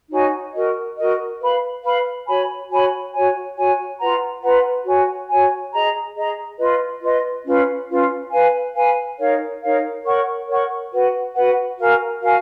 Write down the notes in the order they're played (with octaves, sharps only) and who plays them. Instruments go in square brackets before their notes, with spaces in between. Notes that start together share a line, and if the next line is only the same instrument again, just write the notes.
[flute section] D#4 F#4 C#5 G#5
F#4 A#4 D#5
F#4 A#4 D#5
B4 F5 B5
B4 F5 B5
F#4 C#5 G#5 B5
F#4 C#5 G#5 B5
F#4 C#5 G#5
F#4 C#5 G#5
F4 B4 F#5 A#5
F4 B4 F#5 A#5
F#4 C#5 G#5
F#4 C#5 G#5
G#4 D#5 A#5
G#4 D#5 A#5
F4 B4 D#5
F4 B4 D#5
C#4 F4 B4 F5
C#4 F4 B4 F5
B4 F5 G#5
B4 F5 G#5
D#4 A#4 C#5 F5
D#4 A#4 C#5 F5
A#4 C#5 F#5 C#6
A#4 C#5 F#5 C#6
F#4 B4 F#5
F#4 B4 F#5
F#4 A#4 F5 G#5
F#4 A#4 F5 G#5